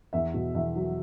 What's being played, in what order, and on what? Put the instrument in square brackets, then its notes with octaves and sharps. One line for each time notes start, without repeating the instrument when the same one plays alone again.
[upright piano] E2 E5
B2
E2 E5
F#3